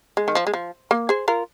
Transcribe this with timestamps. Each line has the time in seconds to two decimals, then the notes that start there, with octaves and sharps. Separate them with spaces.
0.17 G#3
0.28 D#3
0.35 F3
0.47 G#3
0.54 F3
0.91 A#3
1.09 G#4 C5
1.28 F4 A#4